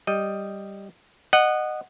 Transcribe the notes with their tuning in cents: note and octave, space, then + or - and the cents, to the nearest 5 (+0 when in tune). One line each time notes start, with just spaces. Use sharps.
G3 +0 D#5 +0
D#5 -20 F#5 +0